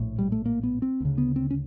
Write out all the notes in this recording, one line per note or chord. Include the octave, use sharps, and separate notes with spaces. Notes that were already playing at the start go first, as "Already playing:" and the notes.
Already playing: A#1 A2
G3
A3
A#3
B3
C4
D2 C#3
B3
C4
C#4